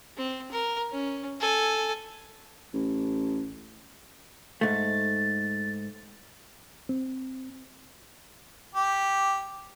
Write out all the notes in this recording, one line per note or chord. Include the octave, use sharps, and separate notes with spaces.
C4
A#4
C#4
A4 G#5
A1
G#2 A3 A6
C4
G4